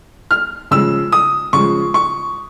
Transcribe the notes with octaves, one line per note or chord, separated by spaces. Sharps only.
F6
C#3 F3 G#3 E6
D#6
C#3 F3 G#3 C#6
C#6